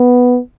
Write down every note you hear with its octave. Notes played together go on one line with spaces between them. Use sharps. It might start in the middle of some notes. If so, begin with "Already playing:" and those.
Already playing: B3